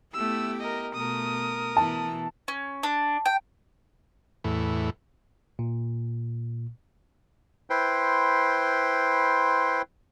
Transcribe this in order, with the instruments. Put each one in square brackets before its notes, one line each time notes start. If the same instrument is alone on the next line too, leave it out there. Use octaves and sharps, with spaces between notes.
[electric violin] A3 E6 [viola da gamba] B3 E4 G4
[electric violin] A#4 D#5
[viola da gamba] B2 A3 [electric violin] A#4 D#6
[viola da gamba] B2 E3 E4 [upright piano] A5
[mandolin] C#4
D4
G5
[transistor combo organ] E2 A2
[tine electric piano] A#2
[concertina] E4 B4 C5 G5 C6